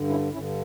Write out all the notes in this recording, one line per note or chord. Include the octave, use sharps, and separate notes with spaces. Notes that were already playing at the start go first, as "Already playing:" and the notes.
Already playing: G2 D3
C#4 E4
G2 D3 C#4 E4